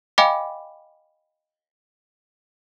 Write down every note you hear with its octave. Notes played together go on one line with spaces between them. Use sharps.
D#5 F5 G5 G#5 B5 D6